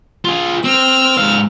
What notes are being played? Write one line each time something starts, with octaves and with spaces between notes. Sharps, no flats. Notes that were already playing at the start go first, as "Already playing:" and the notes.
F4 G#4
C4 E6 F6
G#2 F5